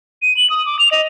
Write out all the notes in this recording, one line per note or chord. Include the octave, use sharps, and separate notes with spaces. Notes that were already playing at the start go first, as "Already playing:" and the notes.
D#7
F#7
D#6
D6
F7
D#5